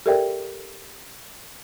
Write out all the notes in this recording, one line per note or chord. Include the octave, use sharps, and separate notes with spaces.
G4 A4 A#4 D5 E5 G5